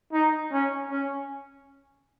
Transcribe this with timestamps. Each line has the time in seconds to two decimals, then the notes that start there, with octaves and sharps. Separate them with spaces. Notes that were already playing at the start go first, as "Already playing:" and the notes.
0.13 D#4
0.52 C#4
0.91 C#4